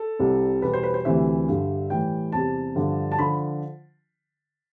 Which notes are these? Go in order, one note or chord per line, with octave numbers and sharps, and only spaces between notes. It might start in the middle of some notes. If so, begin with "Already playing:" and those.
Already playing: A4
C2 C3 G3
E2 B2 G3 B4
C5
B4
C5
D2 C3 E3 G3 E5
G2 D3 G3
A2 E3 G3 G5
E2 C3 G3 A5
G2 D3 F3
A5
D3 F3 B5